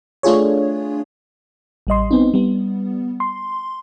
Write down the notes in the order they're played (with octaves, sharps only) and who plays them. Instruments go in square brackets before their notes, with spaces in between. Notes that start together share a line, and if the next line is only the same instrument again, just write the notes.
[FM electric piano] A3 D4 F4 G#4 C#5
A1 G3 D#5 C6
B3 C4 D#4
G3 B3
C6